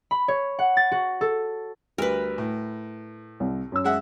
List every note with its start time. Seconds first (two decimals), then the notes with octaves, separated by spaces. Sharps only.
0.11 B5
0.28 C#5
0.59 F#5
0.77 A6
0.92 F#4
1.21 A4
1.98 D2 G3 A#4 B4
2.38 A2
3.40 C2
3.72 F#2 E6
3.84 G#3 E5 F#5